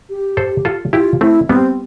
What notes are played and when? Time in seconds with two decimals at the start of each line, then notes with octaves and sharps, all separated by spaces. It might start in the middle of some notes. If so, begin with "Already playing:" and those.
0.10 G4
0.37 A4 C5
0.65 F4 A4
0.93 E4 F4 G4
1.21 A3 C4 E4
1.49 G3 B3 C4